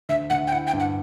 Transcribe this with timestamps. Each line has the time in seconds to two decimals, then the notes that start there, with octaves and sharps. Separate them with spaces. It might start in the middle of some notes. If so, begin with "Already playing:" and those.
0.09 D2 E5
0.30 D2 F#5
0.47 G5
0.52 E4 F#5
0.67 G5
0.74 G2
0.80 F#5